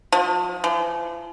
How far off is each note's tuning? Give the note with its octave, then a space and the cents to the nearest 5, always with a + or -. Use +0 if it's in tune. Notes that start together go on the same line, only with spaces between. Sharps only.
F3 +40
F3 -45